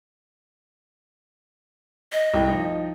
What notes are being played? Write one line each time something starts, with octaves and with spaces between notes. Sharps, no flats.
D#5
C2 A2
F3 D#4